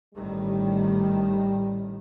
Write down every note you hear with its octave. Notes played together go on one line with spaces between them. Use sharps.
A1 A2 D#3 G3